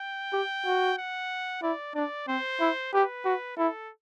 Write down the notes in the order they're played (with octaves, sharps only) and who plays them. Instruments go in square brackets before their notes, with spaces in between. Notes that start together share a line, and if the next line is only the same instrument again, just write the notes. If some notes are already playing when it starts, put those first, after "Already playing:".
Already playing: [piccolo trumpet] G5
[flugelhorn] G4
F#4
[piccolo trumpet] F#5
[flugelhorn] E4 [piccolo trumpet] D5
[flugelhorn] D4 [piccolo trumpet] D5
[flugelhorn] C4 [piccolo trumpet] C5
[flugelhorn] E4
[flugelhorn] G4 [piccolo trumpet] B4
[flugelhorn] F#4
[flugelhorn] E4 [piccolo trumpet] A4